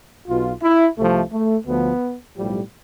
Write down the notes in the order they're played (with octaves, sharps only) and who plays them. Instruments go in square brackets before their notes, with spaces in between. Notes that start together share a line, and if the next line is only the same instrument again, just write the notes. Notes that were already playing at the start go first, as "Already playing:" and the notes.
[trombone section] B1 B2 F4
E4
C2 C3 F3 A3
A3
D2 D3 F3 B3
B1 A2 F3 G3